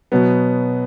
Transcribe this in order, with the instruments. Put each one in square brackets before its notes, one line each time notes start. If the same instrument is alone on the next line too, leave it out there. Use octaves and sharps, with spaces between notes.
[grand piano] B2 F#3 B3